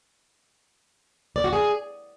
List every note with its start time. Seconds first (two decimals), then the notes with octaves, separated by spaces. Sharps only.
1.36 D5
1.44 F#4
1.53 G#4